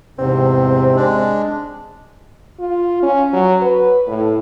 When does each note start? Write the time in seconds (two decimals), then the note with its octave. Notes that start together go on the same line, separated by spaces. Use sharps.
0.19 E2 G#2 C3 C4
0.96 G#3 D4
2.60 F4
3.03 C#4
3.33 F#3
3.62 B4
4.07 A2